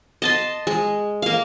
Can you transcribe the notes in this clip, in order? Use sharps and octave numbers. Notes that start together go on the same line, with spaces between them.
D#5 A5 C6
G#3
A#3 F5